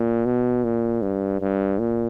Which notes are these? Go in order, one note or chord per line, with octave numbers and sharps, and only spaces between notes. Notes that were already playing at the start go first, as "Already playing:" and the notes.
Already playing: A#2
B2
A#2
G2
G2
A#2